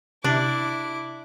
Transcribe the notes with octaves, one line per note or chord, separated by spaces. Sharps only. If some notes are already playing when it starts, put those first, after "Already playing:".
C3 D4 E4 D6